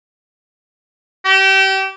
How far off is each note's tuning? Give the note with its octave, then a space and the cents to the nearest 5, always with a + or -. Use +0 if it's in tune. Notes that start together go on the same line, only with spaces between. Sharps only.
G4 -30